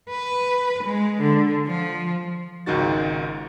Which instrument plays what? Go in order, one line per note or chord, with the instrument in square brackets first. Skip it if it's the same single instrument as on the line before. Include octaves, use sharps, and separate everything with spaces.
[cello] B4
G#3
D3
F3
[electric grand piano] G#1 C#2 D#3 D#4 F#4 A6